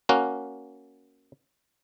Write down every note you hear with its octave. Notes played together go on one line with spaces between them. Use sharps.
A#3 C#4 F#4